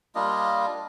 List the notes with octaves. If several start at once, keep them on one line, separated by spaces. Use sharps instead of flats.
G3 A#3 D4 F4 D#5